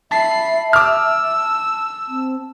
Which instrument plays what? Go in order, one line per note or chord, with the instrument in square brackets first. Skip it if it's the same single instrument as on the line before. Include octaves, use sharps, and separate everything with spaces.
[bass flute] E5 [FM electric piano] A5 [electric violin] B5 C7
[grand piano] D6 F6 [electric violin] E6
[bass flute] C4